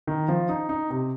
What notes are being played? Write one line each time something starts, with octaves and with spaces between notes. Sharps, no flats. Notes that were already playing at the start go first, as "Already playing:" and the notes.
D#3
F3
D#4
D#4
C3